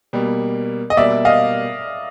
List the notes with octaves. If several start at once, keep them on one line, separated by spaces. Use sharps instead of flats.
B2 G3 A#3
D#5
B2 G3 A#3 D5 E5
D#5 F5